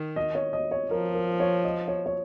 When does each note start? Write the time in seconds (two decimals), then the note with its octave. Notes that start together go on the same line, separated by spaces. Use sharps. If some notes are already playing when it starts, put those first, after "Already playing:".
Already playing: D#3
0.16 D#5
0.35 C#5
0.53 D#5
0.71 C#5
0.91 F3 A#4
1.14 A#4
1.40 C#5
1.64 D#5
1.88 C#5
2.06 C#5